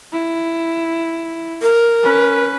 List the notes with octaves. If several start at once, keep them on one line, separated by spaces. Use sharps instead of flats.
E4
A#4
C#4 B4